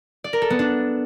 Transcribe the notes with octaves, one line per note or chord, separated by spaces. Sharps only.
D5
A#4
A4
B3
D4